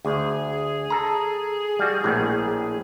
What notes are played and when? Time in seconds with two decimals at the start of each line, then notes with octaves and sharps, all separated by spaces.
0.05 D2 G#4
0.90 A4 A#5
1.79 G3 F#4
2.04 A#1 A2